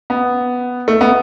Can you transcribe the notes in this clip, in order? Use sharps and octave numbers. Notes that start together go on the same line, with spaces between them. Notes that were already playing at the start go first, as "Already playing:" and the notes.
B3
A3
B3